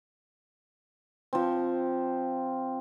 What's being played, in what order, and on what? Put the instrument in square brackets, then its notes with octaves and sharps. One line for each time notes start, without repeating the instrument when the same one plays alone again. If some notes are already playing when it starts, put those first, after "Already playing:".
[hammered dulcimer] F3 C4